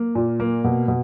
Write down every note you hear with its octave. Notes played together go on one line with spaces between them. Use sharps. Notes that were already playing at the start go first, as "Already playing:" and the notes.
Already playing: A#3
A#2
A#3
B2
B2